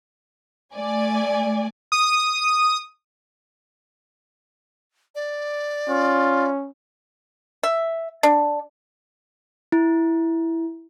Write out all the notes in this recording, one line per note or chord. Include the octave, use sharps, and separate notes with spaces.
A3 D5 G#5
D#6
D5
C#4 F4
E5
D4
E4